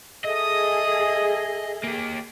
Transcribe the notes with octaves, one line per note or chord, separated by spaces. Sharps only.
G#4 A4 D#5 E5 D#6
A#3 G4